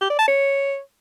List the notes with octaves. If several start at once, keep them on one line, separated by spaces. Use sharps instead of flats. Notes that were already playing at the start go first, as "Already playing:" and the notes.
G4
D5
A5
C#5